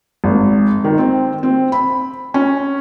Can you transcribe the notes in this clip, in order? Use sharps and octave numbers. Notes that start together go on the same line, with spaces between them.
G#1
D#3
C4
C4
B5
C#4